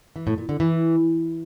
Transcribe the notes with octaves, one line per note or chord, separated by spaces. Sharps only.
E3
A2
A#2
D3
E3